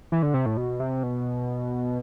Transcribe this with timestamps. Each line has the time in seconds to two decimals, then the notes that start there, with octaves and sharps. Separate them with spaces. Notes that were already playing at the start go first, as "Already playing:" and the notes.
0.12 E3
0.23 D3
0.34 C3
0.46 A2
0.57 B2
0.80 C3
1.03 B2